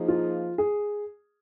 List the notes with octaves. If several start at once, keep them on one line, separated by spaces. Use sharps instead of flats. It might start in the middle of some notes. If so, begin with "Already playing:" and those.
Already playing: F3 A#3 D#4 G#4
F4
G#4